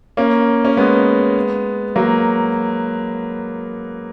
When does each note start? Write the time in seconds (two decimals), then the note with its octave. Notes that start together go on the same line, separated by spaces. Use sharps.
0.17 A#3 C#4
0.65 C#4
0.77 G#3 B3
1.96 F#3 A#3